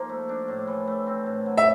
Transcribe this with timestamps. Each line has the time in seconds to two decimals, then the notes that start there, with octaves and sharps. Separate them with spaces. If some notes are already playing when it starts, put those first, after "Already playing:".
Already playing: F3 A#3 D#4
0.09 A3
0.29 D4
0.48 A2
0.67 E3
0.87 A3
1.07 C4
1.26 A2
1.46 F#3
1.57 E5